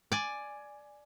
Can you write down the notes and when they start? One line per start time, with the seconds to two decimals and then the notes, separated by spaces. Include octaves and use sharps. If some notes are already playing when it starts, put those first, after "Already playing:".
0.12 D5 G#5